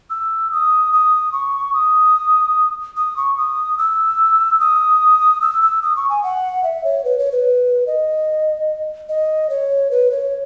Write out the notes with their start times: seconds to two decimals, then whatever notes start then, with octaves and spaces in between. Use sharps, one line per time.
0.10 E6
0.52 D#6
0.92 D#6
1.32 C#6
1.73 D#6
2.96 D#6
3.17 C#6
3.37 D#6
3.78 E6
4.60 D#6
5.41 E6
5.62 E6
5.82 D#6
5.96 C#6
6.09 G#5
6.23 F#5
6.64 E5
6.85 C#5
7.05 B4
7.19 C#5
7.32 B4
7.87 D#5
9.09 D#5
9.50 C#5
9.91 B4
10.11 C#5